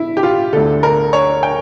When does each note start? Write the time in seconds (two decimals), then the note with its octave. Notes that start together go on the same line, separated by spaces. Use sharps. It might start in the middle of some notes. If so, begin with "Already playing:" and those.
Already playing: E4
0.17 G4
0.23 F4
0.53 D2 D3 A4
0.83 A#4
1.13 C#5
1.43 G5